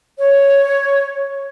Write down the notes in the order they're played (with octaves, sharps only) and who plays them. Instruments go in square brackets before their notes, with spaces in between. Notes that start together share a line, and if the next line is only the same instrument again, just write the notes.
[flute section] C#5